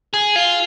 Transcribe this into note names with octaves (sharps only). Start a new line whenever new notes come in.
G#4
F4